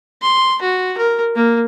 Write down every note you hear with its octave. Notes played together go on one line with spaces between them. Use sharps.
C6
F#4
A#4
A#3